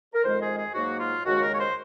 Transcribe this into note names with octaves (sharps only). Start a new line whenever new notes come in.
A#4
F2 D#3 G#3 C5
G#4
G#4
G#2 F#3 A#3 F#4
F4
D#2 C#3 G#3 F#4
A#4
C#5
C5